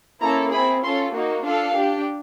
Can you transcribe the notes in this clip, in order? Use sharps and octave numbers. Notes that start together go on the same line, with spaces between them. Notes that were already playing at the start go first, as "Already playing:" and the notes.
A#3 C#4 E4 A4 A#5
C4 E4 G#4 B5
C#4 F4 A4 C6
A#3 D#4 F#4
D4 F4 A4 F5
D4 G4